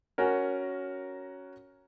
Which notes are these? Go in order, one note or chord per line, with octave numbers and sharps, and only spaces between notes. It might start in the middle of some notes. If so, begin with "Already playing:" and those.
C#4 F#4 A#4